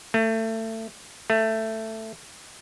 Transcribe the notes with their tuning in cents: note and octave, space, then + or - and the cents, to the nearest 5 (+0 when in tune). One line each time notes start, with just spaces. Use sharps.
A3 +25
A3 +10